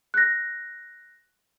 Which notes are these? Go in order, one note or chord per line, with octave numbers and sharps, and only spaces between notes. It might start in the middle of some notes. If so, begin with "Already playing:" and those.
F#6 A#6